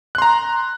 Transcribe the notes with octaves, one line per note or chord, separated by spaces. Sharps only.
A#5 C6 F#6